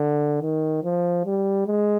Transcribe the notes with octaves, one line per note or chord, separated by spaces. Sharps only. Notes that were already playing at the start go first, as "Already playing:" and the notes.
Already playing: D3
D#3
F3
G3
G#3